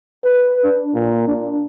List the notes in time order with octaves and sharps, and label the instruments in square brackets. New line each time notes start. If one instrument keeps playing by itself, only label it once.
[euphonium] B4
D4
A#2
D4